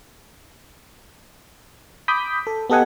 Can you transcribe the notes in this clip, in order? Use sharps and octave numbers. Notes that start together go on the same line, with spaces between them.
B5 D6 D#6 G6 B6
A4
B3 G4 A4 D#5 F#5 G#5